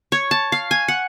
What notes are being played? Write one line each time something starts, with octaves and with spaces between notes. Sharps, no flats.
C#5
A5
F5
G#5
F#5